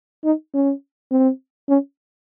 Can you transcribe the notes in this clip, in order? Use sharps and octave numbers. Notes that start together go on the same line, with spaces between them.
D#4
C#4
C4
C#4